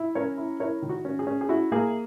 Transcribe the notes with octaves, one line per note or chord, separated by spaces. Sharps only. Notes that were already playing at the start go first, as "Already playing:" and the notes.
Already playing: E4
C#4 A#4 C#5
E4
E4 A#4 C#5
D#3
F#4
C#4
G#4
C#4
G#4
E4 F#4
A#3 G#4